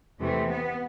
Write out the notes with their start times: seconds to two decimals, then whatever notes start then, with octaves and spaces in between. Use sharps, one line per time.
0.19 E2 C3 E3 A3
0.48 B3